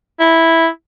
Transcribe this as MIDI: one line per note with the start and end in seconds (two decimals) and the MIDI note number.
0.20 0.67 64